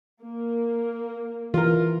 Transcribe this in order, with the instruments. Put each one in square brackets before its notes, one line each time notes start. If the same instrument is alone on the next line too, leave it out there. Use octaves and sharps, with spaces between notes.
[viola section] A#3
[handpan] E3 [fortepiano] F4 A#4